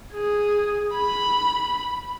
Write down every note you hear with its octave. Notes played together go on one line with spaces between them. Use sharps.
G#4
B5